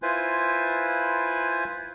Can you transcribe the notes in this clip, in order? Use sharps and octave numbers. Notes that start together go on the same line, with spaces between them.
E4 F4 B4 C5 G#5